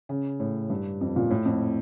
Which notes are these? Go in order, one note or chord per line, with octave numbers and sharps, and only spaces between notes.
C#3
A2
G2
F2
A#2
A2
F2